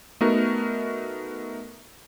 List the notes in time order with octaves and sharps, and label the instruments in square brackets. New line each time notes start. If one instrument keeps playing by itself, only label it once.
[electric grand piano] A3 B3 D#4 F#4 A#4